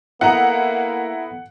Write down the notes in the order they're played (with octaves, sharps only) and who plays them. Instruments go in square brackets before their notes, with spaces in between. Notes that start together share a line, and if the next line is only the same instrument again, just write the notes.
[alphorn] A#3 [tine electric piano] B3 A4 [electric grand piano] E4 D#5 A#5 [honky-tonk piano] F#5